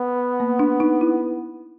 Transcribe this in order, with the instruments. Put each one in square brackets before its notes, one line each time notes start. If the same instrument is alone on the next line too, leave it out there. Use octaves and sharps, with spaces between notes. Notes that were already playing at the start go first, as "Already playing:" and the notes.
Already playing: [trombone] B3
[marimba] A#3
D4
D#4
E4